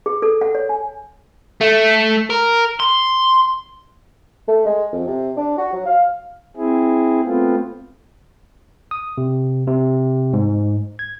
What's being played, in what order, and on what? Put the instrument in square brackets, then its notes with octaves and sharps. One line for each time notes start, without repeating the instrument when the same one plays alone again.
[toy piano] G#4
A4
F#5
C#5
G#5
[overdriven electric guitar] A3
A#4
C6
[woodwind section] A3
G#3
F2
C3
D4
F#4
F#3
F5
[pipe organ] C4 E4 G#4
A3 B3 C4 F4
[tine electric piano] D#6
C3
C3
G#2
G#6